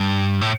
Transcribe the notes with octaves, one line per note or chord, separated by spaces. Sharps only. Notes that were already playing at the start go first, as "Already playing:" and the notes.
Already playing: G2
A2